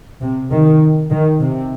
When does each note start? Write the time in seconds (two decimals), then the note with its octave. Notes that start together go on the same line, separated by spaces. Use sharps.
0.21 C3
0.51 D#3
1.11 D#3
1.40 C3